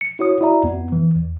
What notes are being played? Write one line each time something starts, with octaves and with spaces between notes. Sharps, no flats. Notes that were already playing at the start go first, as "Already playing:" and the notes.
C#7
E4 F#4 C#5 D#6
E4 F#4 D5 E5 A#5
F2 B3
E3
E2